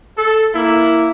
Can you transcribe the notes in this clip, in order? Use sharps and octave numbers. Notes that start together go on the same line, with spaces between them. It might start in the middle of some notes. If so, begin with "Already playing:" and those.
A4
A#3 E4